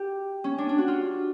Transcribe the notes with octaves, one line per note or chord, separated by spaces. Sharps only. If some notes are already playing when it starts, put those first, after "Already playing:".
Already playing: G4
C#4
D4
D4
F#4
F4